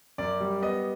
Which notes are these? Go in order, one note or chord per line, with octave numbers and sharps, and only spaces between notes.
F#2 D5
G3
B3 D#5